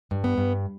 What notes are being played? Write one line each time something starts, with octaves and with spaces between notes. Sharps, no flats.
G2
B3
G2